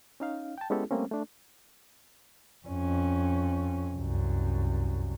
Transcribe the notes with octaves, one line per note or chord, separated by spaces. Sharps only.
C#4 D#4 F5
G5 A5
G#3 B3 C#4 E4 G4 A4
G3 A3 A#3 C4 C#4
A3 D4
F2 C#4
C2 F#2